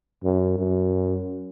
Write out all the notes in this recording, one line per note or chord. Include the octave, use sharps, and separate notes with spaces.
F#2
F#2